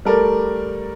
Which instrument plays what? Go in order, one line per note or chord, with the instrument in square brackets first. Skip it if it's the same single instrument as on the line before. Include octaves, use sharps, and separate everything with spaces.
[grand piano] G3 A3 A4 A#4 D5